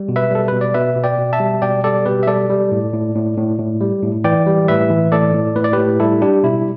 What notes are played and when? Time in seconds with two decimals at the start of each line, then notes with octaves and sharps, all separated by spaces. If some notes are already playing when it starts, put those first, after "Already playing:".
Already playing: G3
0.09 B2
0.16 B4 E5
0.31 G3 A4
0.48 B2 B4
0.61 D5
0.74 B2 B4 E5
0.96 B2
1.04 D5 G5
1.18 B2
1.33 E5 A5
1.40 G3
1.62 B2 D5 G5
1.84 G3 A4 D5
2.06 B2 G4 B4
2.23 E5
2.27 G3 A4 D5
2.49 G3
2.72 A2
2.93 A2
3.15 A2
3.37 A2
3.59 A2
3.81 G3
4.03 A2
4.24 E3 D5 G5
4.46 G3
4.68 A2 B4 E5
4.90 E3
5.12 A2 A4 D5
5.34 A2
5.56 A2 B4
5.64 D5
5.73 A2 G4 B4
6.00 G3 E4 A4
6.22 G3 D4 G4
6.43 B2 E4